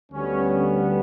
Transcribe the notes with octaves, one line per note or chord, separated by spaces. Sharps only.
D2 D3 G3 B3 C#4
C#4